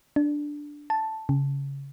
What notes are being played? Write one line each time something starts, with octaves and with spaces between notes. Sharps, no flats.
D4
A5
C#3